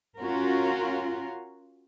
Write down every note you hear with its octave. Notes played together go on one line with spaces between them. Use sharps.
C#4 F4 F#4 A#4